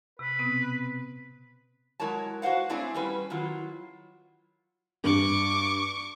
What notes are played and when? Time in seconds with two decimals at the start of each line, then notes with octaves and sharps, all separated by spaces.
0.19 C3 B4
0.39 B2 B3 C4
2.00 F#3 G#3 E4 A#4 C#5 A5
2.42 F#4 B4 C5 F5 F#5
2.70 A3 C4 D4 E4 G#4 C#5
2.95 G3 C#4 B4
3.30 D#3 F#3 E4 F4
5.04 G2 C#6 D6